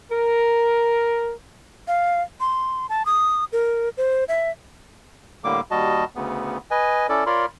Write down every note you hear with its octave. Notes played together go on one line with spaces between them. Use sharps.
A#4
F5
C6
A5
D#6
A#4
C5
E5
A2 D3 G3 A#3 D6
D#2 G3 F#4 D#5 A5
D2 C#3 B3
B4 D#5 G#5
C#4 E4 A4 D5
F4 A#4 C#5 D5 B5 C6